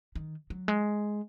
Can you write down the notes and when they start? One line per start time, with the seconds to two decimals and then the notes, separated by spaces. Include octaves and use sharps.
0.15 D#3
0.50 F#3
0.68 G#3